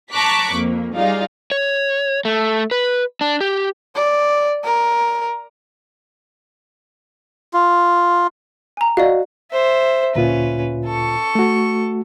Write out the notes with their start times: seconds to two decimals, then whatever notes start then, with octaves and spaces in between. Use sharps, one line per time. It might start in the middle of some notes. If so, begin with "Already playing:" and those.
0.12 A5 A#5 C#6 D6 F#6 B6
0.53 F2 A#3
0.96 G3 D#4 F4 G#4 D5 F5
1.51 C#5
2.25 A3
2.71 B4
3.21 D4
3.41 G4
3.95 D5
4.65 A#4
7.54 F4
8.77 G#5 A#5
8.97 F#4 D5 D#5 F5
9.51 C5 E5
10.15 D2 A#2 C#4 F4 B4
10.85 A4 C#6
11.35 A3 F#4